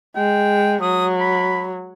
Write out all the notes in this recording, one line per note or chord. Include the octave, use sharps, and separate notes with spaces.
G#3 G5
F#3 D#6
B5